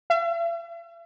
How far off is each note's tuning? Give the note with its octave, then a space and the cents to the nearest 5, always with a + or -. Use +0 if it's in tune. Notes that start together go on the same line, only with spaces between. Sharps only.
E5 +45